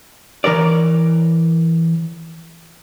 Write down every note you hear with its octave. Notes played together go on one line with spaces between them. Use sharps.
E3 A#4 C#5 D5